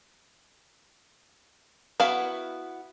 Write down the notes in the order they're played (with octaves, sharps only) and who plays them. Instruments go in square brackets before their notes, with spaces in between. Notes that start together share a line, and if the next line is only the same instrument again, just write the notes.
[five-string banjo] B3 E4 F#4 F5